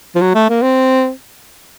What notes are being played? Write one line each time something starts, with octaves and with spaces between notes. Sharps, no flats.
F3
F#3
A3
A#3
C4